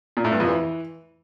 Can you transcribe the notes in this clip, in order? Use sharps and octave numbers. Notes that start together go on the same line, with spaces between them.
A#2
A2
G2
F2
E3